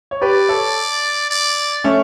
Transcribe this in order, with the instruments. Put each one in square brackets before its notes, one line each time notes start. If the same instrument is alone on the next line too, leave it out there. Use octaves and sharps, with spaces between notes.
[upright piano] C#5
[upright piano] G4 B4 [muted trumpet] D5
[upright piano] A4 C#5
[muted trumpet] D5
[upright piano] A3 C#4